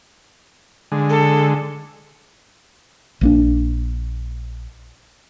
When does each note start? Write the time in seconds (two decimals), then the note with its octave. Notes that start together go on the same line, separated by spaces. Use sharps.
0.92 D3 G#3
1.10 A4
3.21 A#1 A#3 D4